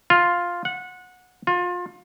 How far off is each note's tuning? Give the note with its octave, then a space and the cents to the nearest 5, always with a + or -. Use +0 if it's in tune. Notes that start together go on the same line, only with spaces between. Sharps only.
F4 +5
F#5 -20
F4 +30